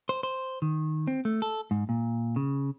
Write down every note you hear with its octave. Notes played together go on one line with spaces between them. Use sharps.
C5
C5
D#3
C4
A3
A4
G#2
A#2
C#3